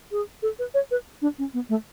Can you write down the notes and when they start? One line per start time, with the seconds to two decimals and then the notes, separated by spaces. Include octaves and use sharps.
0.12 G#4
0.42 A4
0.59 B4
0.74 C#5
0.91 B4
1.22 D4
1.38 C#4
1.54 B3
1.69 A3